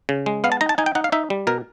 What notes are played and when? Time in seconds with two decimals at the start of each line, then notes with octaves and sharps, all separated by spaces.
0.09 C#3
0.26 G#3
0.44 B3 F5
0.52 A5
0.61 D#4 A#5
0.69 A5
0.78 D#4 G#5
0.86 G5
0.95 D#4 F#5
1.04 F5
1.12 D#4 E5
1.30 G3
1.47 B2 A#4